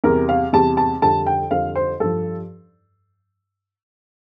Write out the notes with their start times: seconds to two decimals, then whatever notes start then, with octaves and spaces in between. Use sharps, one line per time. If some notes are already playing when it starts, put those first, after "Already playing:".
0.04 E2 C3 G3 A#4
0.29 F5
0.53 E2 C3 G3 A5
0.77 A5
1.02 F2 D3 G3 A5
1.26 G5
1.51 F2 D3 G3 F5
1.76 C5
2.00 G2 F3 A4